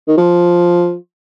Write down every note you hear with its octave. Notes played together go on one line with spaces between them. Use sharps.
D#3
F3